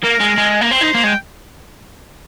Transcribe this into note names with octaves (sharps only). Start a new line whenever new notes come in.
A#3 A#4
G#3
G#3
A#3
C4 C5
D#4
A#3
G#3
G5